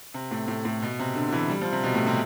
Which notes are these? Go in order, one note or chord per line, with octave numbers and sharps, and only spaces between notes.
C3
A2
A2
A2
B2
C3
D3
D3
E3
G3
F3
C3
B2
A2
C3